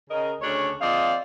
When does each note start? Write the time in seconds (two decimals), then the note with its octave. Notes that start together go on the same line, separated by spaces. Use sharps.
0.10 C#3 A#4 D#5
0.42 D2 C#3 D4 C#5
0.81 F3 C4 G#4 D5 D#5 F5